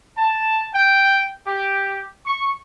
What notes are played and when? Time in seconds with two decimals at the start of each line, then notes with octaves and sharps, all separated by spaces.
0.16 A5
0.73 G5
1.46 G4
2.25 C#6